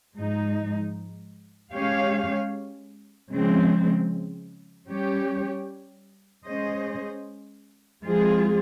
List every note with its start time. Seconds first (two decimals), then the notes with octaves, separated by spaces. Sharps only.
0.17 G#2 F3 G#3 D#4
1.74 G#3 C#4 G4 C#5 F5
3.31 C#3 F3 G#3 C4
4.89 G3 C#4 G4 C#5
6.46 G#3 C#4 G#4 C5 D#5
8.04 F3 G#3 C4 F4 G#4